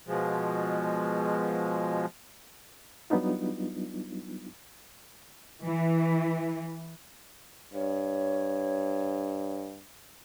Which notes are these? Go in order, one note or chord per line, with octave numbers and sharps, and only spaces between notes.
B2 F3 G#3
F#3 G3 B3 D4 D#4 F4
E3
G2 C#5